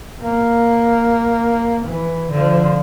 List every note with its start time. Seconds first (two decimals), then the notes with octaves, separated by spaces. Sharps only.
0.23 A#3
1.85 E3
2.31 D3 F3